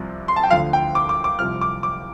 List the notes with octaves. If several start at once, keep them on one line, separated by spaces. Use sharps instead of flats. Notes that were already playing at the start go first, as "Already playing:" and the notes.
Already playing: C2 C3 F3
C6
A5
G5
D2 D3 F3 F5
G5
D6
D6
D6
C2 C3 F3 F6
D6
D6